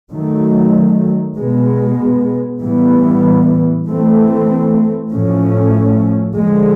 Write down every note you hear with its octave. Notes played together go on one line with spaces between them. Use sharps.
D#3 F#3 A3
B2 G#3 B3
A2 E3 G3 B3
E3 A3 C4
A2 F3 A3 C#4
D3 F3 G#3